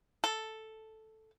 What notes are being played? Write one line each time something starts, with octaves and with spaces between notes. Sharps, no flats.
A4